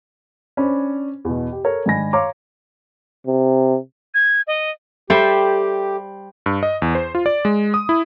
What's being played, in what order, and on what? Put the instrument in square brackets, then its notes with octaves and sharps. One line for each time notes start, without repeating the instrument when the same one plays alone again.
[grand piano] C#4 D4 C5 B5
E2 B2
G4
A4 A#4 C#5
G#2 D#3 D4 G#5 B5 A#6
C#5 F5 A#5 C6 D6
[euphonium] C3
[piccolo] G#6
D#5
[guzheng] G3 C5 [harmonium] G4 [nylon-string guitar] A4 E5
[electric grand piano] G2
D#5
E2
C5
F4
D5
G#3
D#6
E4